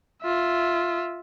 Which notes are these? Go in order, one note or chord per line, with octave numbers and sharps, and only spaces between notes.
F4 E5